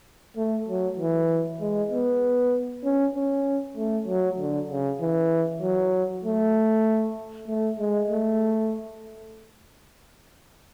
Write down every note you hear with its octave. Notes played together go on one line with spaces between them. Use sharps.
A3
F#3
E3
G#3
B3
C#4
C#4
A3
F#3
D3
C#3
E3
F#3
A3
A3
G#3
A3